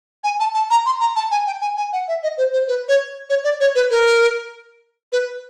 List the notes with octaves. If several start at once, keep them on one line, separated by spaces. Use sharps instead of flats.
G#5
A5
A5
A#5
C6
A#5
A5
G#5
G5
G#5
G#5
F#5
E5
D#5
C5
C5
B4
C#5
C#5
D5
C#5
B4
A#4
B4